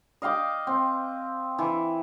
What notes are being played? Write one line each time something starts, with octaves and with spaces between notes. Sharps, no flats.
D#5 F5 G5 D6
C4
E3